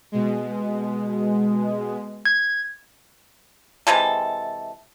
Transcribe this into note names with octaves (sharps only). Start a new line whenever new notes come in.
B2 G#3
G#6
C3 E3 G#3 A4